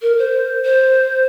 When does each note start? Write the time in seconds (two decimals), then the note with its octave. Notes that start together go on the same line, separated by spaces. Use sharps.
0.01 A#4
0.18 C5
0.65 C5